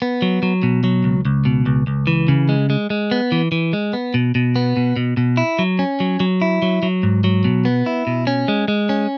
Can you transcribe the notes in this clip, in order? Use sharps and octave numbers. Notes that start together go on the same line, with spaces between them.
B3
F#3
F#3
B2
F#3
C#2
C#2
B2
C#2
C#2
E3
C#3
G#3
G#3
G#3
B3
E3
E3
G#3
B3
B2
B2
B3
B2
B2
B2
E4
F#3
C#4
F#3
F#3
E4
F#3
F#3
G#2
F#3
B2
B3
E4
B2
C#4
G#3
G#3
C#4